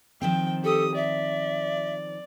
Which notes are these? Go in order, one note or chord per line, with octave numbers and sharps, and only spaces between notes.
D#3 F3 C4 G5
G4 A4 D#6
D5 E5